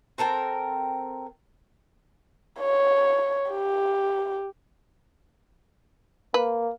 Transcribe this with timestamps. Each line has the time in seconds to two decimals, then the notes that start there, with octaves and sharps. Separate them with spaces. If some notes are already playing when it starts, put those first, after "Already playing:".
0.18 C4 A4 A#4 G5
2.60 C#5
3.50 G4
6.34 A#3 B4